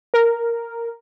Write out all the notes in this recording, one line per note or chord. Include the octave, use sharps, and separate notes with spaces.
A#4